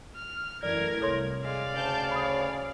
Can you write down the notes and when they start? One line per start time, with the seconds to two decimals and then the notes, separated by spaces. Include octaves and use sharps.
0.15 F6
0.63 F#2 E3 A3 A#4 D5 G#6
1.01 C2 A4 C#5 C6
1.44 G#3 D5 F5
1.76 D2 C#3 A5 G6
2.11 C#5 B5 D#6